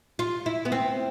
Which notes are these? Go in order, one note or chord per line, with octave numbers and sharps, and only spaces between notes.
F4
E4
B3
C4